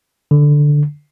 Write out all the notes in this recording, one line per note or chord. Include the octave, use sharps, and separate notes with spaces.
D3